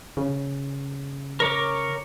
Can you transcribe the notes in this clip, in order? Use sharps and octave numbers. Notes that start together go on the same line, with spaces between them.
C#3
A#4 C#5 D6